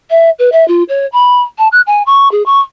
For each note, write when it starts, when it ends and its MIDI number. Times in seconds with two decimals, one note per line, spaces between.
0.10 0.29 76
0.38 0.49 71
0.52 0.66 76
0.68 0.83 65
0.88 1.06 73
1.12 1.41 83
1.58 1.67 81
1.72 1.81 90
1.86 2.02 80
2.06 2.30 85
2.31 2.43 68
2.46 2.60 85